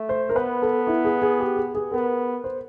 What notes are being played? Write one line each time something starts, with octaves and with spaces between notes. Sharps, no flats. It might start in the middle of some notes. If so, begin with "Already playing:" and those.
Already playing: A3
C5
A#4
B3 B4
A4
E4
G#4
G#4
G4
G#4
G#4
B3 A#4
C5